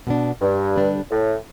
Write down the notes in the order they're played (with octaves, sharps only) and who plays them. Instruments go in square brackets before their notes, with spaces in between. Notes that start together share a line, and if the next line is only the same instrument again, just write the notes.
[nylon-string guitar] B2 B3 D4
[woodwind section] G2
[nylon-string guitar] D3 G3 D4 B4
[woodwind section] A2